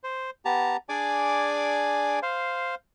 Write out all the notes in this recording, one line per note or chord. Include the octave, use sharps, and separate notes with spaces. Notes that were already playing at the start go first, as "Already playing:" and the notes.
C5
B3 G4 A5 A#5
D4 G#4 D5 G#5 D6
C5 F5